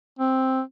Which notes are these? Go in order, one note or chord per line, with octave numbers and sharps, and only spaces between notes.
C4